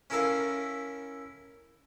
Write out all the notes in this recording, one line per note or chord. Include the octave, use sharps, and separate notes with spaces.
C#4 E4 A4 A#4 E5 F5